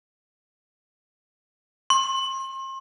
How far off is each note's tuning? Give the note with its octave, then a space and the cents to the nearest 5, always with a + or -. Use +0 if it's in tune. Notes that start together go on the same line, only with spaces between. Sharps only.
C6 +35